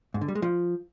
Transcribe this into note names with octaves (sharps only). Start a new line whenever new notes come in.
G#2
D3
G3
G#3
F3